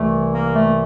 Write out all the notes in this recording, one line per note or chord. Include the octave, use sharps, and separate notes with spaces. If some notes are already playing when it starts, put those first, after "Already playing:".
Already playing: C2 C3 E3 A3
A#3
A3